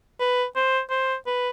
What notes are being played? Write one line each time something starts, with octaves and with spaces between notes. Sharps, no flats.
B4
C5
C5
B4